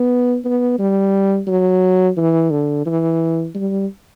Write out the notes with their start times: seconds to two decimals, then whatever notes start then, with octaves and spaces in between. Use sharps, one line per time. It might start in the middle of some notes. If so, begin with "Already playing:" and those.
Already playing: B3
0.45 B3
0.79 G3
1.47 F#3
2.17 E3
2.51 D3
2.86 E3
3.55 G3